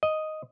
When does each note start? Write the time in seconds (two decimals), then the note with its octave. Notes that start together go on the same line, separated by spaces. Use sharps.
0.03 D#5